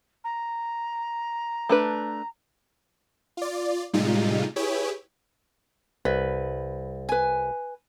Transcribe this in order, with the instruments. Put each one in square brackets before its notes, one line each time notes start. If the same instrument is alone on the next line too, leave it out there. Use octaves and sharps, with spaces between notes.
[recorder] A#5
[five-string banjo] A3 D4 B4
[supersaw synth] F4 D5
A2 C3 G3 G#3 D#4 F4
E4 G4 G#4 B4 C#5
[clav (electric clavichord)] C2 [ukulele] B4
[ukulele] B4 G#5